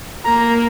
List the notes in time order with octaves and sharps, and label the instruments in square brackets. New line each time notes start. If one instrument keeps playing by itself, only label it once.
[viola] A#3 [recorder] A#5